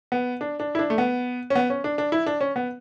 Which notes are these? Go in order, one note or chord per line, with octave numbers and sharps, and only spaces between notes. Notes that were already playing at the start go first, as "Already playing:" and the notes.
B3
D4
D4
E4
D4
A3
B3
C#4
B3
C#4
D4
D4
E4
D4
C#4
B3